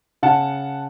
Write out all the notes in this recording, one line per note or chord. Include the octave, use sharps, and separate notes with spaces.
C#3 F#5 A5